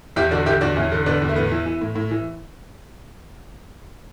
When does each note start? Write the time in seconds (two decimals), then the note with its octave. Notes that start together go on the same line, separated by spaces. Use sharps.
0.16 E2 E4 G4
0.31 D3 D4 F#4
0.46 D3 E4 G4
0.61 E2 D4 F#4
0.76 E2 C#4 E4
0.92 D3
1.06 D3 B3 D4
1.22 E2
1.29 A3
1.36 A2 B3
1.51 E3
1.66 E3
1.81 A2
1.95 A2
2.11 E3